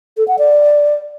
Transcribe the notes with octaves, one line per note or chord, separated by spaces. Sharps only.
A4
F#5
D5